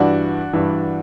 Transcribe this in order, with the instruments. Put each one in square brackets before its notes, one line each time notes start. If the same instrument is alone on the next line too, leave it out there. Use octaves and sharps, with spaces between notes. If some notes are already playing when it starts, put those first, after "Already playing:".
Already playing: [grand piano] G2 E3 D4 F#4
G2 E3